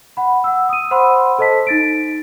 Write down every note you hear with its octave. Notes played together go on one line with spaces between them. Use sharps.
F#5 B5
F#5 E6
D#6 D#7
C5 F#5 B5 C6 E6
A4 C5 D#5 A5 B6
D#4 A6 D7